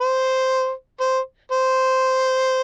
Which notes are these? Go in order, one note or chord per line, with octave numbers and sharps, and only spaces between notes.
C5
C5
C5